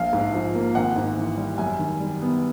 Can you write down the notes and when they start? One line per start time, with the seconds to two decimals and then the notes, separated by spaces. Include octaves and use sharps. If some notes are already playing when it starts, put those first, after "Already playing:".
Already playing: A#1 F5
0.13 G#2
0.34 F3
0.55 A#3
0.75 G#1 F#5
0.96 G#2
1.18 E3
1.37 G3
1.58 F#2 G#5
1.79 D#3
2.00 G3
2.21 B3